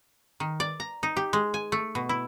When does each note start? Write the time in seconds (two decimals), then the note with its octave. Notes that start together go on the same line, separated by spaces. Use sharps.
0.40 D#3
0.60 D5
0.80 A#5
1.03 D#4
1.17 G4
1.33 G#3
1.54 G#5
1.72 A3
1.95 B2
2.09 E4